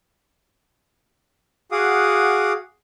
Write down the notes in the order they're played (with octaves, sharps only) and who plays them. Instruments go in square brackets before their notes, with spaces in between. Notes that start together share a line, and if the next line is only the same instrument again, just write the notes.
[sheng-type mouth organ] F#4 G#4 F5 F#5 D6 D#6